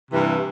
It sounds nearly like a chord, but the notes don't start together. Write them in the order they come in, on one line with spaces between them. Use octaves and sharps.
C3 E3 G2